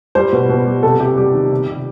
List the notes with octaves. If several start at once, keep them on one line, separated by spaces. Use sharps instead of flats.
G3 C5
B2
B2
G3
C3 A4
C3 G4
G3 G4
D#3
C3
C3